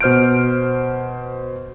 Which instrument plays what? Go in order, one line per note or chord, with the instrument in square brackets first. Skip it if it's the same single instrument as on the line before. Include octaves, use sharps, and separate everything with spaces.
[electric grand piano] B2 C5 F6 G6 D7